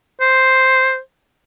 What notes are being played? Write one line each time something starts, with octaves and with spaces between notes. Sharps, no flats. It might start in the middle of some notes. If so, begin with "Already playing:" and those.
C5